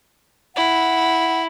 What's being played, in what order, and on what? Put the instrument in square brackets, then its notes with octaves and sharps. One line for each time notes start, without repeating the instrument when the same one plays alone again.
[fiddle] E4 [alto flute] F#5